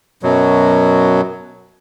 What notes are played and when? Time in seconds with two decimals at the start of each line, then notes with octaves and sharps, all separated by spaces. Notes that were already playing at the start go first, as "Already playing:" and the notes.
0.23 F#2 B2 F#3